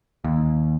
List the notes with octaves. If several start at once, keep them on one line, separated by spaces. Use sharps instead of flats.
D#2